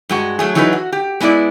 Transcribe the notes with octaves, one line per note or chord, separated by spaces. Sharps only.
G2 G#3 F#4
F#3 A3 G#4
E3 F#3 D#4 G#4 A4 B4
F#4
G4
G#3 B3 D4 E4 D5